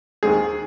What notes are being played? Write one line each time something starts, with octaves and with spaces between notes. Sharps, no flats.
D#2 D#3 G#3 C4 G#4